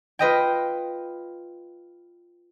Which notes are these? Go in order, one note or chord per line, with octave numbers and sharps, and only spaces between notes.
F4 B4 D#5 G5